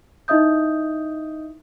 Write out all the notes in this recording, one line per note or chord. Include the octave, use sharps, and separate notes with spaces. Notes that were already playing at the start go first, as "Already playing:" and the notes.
D#4 E4 D#5 E5 D#6 G6